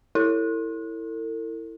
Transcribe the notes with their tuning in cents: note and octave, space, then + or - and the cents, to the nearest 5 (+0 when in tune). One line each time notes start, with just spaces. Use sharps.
E4 +0 A4 +45